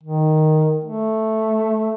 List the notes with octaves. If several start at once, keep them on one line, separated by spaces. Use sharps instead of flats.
D#3
A3